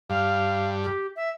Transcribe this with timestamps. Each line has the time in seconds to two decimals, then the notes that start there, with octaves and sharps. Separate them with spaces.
0.10 G2 F5
0.84 G4
1.16 E5